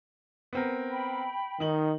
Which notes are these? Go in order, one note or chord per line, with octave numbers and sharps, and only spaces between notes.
B3 C4 A#4
G5 B5
D#3 D#4 F#7